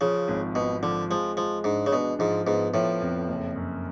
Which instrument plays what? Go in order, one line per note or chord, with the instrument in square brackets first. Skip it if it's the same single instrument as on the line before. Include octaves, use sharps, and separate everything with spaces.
[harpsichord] C#3 [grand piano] F3
[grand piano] G#1
[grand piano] G#1 [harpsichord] B2
[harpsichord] D3 [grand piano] F3
[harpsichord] F3 [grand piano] G#3
[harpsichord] F3 [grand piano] G#3
[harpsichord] G#2 [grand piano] D4
[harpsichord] C#3
[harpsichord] B2 [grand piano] D4
[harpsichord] G#2 [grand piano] F3
[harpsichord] G#2 [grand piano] B3
[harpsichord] A2 [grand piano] F3
[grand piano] F2
F#1
F#2